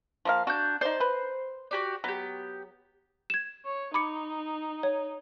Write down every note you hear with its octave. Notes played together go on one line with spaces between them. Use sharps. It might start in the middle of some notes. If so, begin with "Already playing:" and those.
F3 A#3 F5
D4 F#4 G6
D#4 C5 D5
B4
F#4 G4 D5
F#3 B3 G4
G#6 E7
C#5
D#4 B5 D6 C#7
C#5